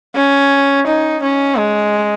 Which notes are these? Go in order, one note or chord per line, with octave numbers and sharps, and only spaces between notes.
C#4
D#4
C#4
G#3